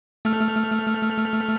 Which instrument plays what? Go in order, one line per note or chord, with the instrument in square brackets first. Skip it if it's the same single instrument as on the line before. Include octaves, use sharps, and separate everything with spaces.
[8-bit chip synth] A3 F6